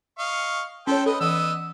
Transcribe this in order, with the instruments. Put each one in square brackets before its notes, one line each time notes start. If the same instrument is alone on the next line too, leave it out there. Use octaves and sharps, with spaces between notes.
[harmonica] D#5 F5 C#6
[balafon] C#4 C#5 [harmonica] A4 C5 G5
[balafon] A4 [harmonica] B4 D#5
[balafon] E3 [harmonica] B3 D#5 E6